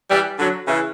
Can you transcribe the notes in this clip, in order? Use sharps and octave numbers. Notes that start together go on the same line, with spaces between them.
E3 G3
D3 F#3
C#3 E3